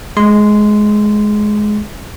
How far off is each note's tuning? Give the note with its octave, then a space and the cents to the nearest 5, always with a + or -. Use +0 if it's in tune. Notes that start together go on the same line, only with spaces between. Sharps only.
G#3 +15 C6 -15